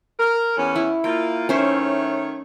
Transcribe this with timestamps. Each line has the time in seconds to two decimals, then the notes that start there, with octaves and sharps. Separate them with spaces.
0.20 A#4
0.57 E2 C#4
0.75 E4
1.04 A#3 F4 G5
1.49 D#3 A3 C#4 C5 C#5 E5